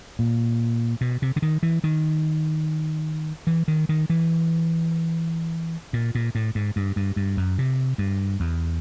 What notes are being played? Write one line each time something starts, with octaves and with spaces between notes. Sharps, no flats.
A#2
B2
C3
D3
D#3
E3
D#3
E3
D#3
D#3
E3
A#2
A#2
A2
G#2
G2
G2
G2
F#2
C3
G2
E2